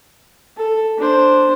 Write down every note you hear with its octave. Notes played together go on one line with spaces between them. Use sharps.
A4
D4 C5